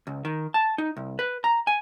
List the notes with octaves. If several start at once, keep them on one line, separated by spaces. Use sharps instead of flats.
C#2
D#3
A5
D#4
C2
B4
A#5
G#5